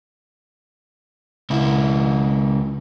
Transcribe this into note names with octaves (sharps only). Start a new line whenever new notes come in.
C#2 E4